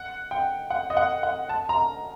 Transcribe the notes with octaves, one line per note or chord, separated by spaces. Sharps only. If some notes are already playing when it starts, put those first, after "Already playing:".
Already playing: F#5
G5
F#5
D#5
F#5
F#5
A5
A#5